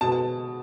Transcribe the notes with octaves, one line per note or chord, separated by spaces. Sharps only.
B2 A5
A5